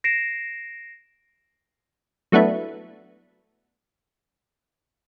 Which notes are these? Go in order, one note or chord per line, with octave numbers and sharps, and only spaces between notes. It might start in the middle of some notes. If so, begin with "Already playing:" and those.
A#6 C7 D7 E7
F#3 A3 B3 D4 E4